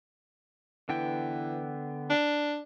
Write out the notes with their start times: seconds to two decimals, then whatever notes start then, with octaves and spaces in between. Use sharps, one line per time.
0.89 D3 E3 B3 G5
2.10 D4